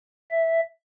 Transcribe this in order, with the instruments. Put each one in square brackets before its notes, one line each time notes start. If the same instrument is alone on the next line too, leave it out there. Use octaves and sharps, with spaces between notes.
[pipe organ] E5